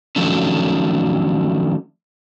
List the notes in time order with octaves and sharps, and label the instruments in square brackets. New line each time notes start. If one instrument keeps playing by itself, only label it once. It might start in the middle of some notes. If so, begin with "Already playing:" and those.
[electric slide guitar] D#3 F3 F#3 A3 C#4 D4